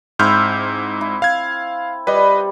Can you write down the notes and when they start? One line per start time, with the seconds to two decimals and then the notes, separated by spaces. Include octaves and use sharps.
0.19 G#2 C4 E4 F6 G6
1.01 E4
1.22 F5 G#6
2.07 G3 B4 D#5